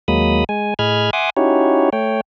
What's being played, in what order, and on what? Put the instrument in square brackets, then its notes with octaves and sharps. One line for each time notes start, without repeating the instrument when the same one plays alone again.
[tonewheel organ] D#2 F#3 G#3 A#3 B5 D#6
G#3 G#5
A2 G#4 D#5 B5 F6 G#6
E5 F#5 G#5 C6 D6 D#6
C#4 D#4 E4 F#4 G4 C#5
A3 C#5 G5